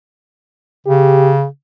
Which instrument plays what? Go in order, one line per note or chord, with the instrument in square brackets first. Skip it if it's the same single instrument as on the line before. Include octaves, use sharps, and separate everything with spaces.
[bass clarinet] C#3 [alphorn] G4